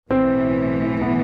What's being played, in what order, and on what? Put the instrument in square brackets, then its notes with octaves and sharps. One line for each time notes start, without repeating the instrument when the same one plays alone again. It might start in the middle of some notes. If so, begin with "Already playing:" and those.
[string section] B1 A2 E3 [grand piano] C4
[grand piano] B3